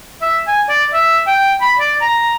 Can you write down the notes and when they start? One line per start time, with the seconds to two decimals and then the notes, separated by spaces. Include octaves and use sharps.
0.22 E5
0.48 G#5
0.69 D5
0.94 E5
1.27 G5
1.61 B5
1.79 D5
2.01 A#5